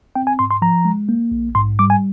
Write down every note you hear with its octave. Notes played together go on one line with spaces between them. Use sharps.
C4 G5
G#5
G#2 C6
C6
F3 A#5
G#3
A#3
A#1
G#2 C6
G3 D6
G#5